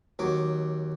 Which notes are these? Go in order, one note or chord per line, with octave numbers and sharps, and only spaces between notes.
D#2 F#3 D6